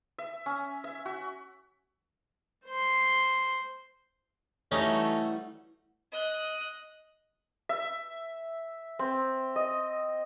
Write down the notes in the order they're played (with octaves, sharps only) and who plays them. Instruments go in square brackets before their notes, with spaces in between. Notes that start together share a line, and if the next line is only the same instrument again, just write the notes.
[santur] E5
C#4
E5
F#4
[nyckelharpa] C5 C6
[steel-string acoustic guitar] E3 G3 F#4 [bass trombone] A3 [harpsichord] C#4 D#4
[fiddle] D#5 F#6
[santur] E5
C4
D#5